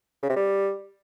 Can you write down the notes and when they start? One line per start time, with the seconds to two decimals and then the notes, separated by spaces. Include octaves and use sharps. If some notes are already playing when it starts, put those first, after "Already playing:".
0.23 C#3
0.30 C3
0.36 G3